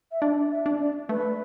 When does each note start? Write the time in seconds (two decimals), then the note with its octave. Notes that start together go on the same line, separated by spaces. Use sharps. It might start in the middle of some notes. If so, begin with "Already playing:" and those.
0.12 E5
0.21 D4 D5
0.51 E5
0.66 D4
0.80 D5
1.09 A3 B4